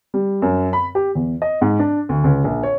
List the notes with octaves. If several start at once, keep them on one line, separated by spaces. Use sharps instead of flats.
G3
F#2
B5
G4
E2
D#5
G#2
D4
D2
C#2
A#1
C#5